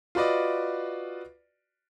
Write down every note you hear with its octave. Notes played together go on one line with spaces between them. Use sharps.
F4 F#4 B4 D5 D#5